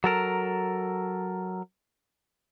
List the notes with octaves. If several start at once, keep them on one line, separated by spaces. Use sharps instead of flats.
F#3 A4 A#4